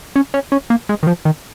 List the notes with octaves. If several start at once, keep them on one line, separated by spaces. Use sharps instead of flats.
C#4
C#4
C#4
A#3
G#3
D#3
F3
D#3